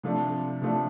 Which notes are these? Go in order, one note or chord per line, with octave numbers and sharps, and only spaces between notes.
C3 F3 A3 D4
C3 F3 A3 D4